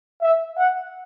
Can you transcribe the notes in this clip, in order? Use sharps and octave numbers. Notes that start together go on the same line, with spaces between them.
E5
F#5